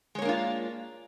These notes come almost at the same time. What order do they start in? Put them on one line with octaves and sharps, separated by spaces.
G#3 C#5 A#3 D4 F4